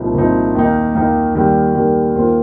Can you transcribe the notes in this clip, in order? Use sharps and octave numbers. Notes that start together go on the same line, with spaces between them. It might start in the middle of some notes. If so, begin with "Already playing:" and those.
Already playing: C2 A#2 F3 C4 D#4
C2 A#2 F3 C4 D#4
D#2 D#3 A#3 D#4
D#2 D#3 A#3 D#4
D#2 D#3 G3
D#2 D#3 G3
D#2 D#3 A#3 F4 C5